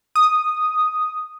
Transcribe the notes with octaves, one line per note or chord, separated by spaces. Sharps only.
D#6